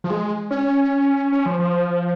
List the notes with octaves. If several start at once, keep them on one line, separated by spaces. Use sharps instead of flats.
F3
G#3
C#4
C#4
F3
F3